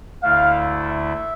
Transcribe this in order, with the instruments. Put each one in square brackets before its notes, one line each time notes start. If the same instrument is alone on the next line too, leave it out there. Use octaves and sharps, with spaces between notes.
[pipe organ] D2 D3 A3 E4 [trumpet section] F5
[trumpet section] E5